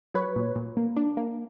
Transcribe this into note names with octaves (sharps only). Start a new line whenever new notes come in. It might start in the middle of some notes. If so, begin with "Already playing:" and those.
F#3 B4 C#5
A#2
A#2
A#3
D4
A#3